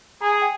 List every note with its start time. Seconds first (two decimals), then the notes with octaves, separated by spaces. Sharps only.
0.21 G#4 A#5
0.32 G#5
0.42 G5